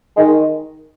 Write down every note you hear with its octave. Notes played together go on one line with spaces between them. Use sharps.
D#3 G#3